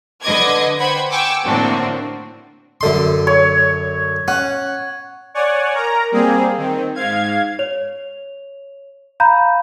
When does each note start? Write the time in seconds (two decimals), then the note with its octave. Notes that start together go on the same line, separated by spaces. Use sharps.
0.22 D3 B4 D#5 D6 G#6
0.78 B4 C5 F#5 G5 B5 G#6
1.11 G5 G#5 C#6 D6 E6
1.44 A2 D3 A#3 C4 D4 F#4
2.81 F#2 D3 C6
3.27 C#5
4.28 C#4 F#5
5.34 C#5 D5 F#5 G#5
5.75 A#4 A#5
6.12 G3 A#3 C4 G#4
6.58 D#3 C4
6.95 G#2 F5 G#6
7.59 C#5 F7
9.20 F5 A#5 B5 G6